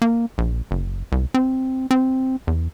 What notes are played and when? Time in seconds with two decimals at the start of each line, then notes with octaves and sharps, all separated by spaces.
0.02 A#3
0.38 A#1
0.71 F#1
1.12 C2
1.34 C4
1.91 C4
2.47 E2